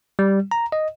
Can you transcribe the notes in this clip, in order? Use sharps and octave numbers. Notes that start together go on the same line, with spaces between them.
G3
A#5
D#5